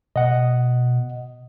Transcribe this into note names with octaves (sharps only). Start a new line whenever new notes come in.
B2 D#5 F#5